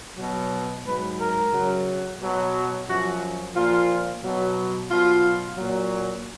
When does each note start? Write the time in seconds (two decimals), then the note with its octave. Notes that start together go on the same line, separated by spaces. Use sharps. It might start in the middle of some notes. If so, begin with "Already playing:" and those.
0.18 B2 F#3
0.84 G#2 F#3 B4
1.18 A#4
1.53 F#2 C#3 F#3
2.20 B2 F#3
2.87 F#2 F3 F#4
3.55 A#2 F3 F4
4.22 B2 F#3
4.90 B2 F#3 F4
5.58 A#2 F#3